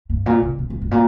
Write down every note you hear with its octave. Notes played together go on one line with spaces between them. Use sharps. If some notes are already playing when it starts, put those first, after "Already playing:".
G2
A#2
C3
A#2
G2
G2
A#2